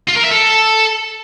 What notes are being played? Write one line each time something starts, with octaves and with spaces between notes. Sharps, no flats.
F4
A#4
E5
A4